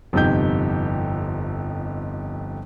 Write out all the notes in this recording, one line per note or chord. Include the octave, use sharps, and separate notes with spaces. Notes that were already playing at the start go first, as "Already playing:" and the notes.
G1 F2 C3 D#4 G4 G6